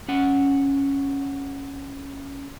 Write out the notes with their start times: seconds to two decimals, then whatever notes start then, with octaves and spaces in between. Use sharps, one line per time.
0.08 C#4 F#5